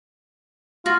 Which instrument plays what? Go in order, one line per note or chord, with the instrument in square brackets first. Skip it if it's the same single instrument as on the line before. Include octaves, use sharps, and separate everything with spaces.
[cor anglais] F4 [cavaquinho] F#4